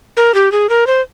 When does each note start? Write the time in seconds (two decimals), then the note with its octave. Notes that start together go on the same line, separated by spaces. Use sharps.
0.17 A#4
0.34 G4
0.52 G#4
0.69 A#4
0.87 C5